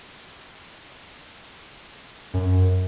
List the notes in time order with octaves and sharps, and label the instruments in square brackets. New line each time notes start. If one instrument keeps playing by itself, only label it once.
[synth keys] F#2